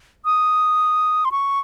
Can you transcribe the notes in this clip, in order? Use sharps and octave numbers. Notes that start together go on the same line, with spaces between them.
D#6
C6
C#6